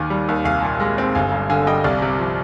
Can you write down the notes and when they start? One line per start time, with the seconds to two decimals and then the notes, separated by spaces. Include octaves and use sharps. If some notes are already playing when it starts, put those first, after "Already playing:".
Already playing: D#2 D#3 F5 G#5
0.10 G3
0.28 D#2
0.45 C2 F5 G#5
0.63 A#2
0.80 G#3
0.98 C4
1.15 G1 F5 G#5
1.32 G2
1.50 D3 F5 G#5
1.67 G3 D#5 G5
1.84 C2 D5 F5
2.02 C3
2.19 F3